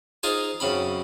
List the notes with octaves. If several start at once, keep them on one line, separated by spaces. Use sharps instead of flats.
D#4 F4 G#4 C5 G#5
F#2 C#3 C4 B5